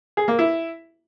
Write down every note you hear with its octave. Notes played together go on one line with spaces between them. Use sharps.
G#4
A#3
E4